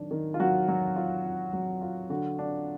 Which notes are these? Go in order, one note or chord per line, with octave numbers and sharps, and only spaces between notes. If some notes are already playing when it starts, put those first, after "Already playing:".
Already playing: D#3 F#3 D4
D#3
F4
F#3 F#4
F#3
F4
F4
F#3
F4
D3 F#4
D4